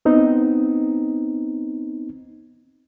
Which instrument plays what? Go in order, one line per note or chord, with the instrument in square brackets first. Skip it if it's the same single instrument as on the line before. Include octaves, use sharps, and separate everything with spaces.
[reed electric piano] B3 C4 D#4